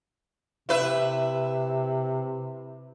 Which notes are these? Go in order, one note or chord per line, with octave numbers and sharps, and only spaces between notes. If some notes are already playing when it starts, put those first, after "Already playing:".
C3 E4 B4 E5